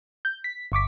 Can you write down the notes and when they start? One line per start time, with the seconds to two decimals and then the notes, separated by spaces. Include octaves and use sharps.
0.25 G6
0.44 B6
0.72 G1 C#6 D6 B6